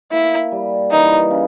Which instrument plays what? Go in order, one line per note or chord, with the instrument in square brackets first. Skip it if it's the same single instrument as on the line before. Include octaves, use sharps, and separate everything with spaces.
[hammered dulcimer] A#3 [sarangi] E4
[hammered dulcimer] G3
[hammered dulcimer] E3 [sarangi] D#4
[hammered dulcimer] C#3